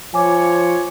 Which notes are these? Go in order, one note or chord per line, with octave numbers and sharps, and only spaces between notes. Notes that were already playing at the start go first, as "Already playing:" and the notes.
F3 C#5 G#5 D6